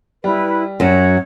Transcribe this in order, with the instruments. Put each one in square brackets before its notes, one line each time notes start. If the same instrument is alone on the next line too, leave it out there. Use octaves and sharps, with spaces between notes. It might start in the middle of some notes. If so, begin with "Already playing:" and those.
[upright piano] G3 [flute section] E4 B4
[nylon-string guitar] F#2 F#3 [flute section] C#5 F#5